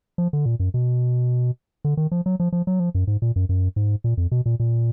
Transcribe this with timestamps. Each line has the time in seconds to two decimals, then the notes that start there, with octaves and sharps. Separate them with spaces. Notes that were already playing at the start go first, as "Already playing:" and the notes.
0.18 F3
0.33 D3
0.46 A#2
0.60 F#2
0.74 B2
1.85 D3
1.97 D#3
2.12 F3
2.26 F#3
2.40 F3
2.53 F3
2.67 F#3
2.80 F3
2.95 F#2
3.07 G#2
3.22 A#2
3.36 F#2
3.49 F#2
3.76 G#2
4.04 A#2
4.17 F2
4.32 B2
4.46 A#2
4.60 A#2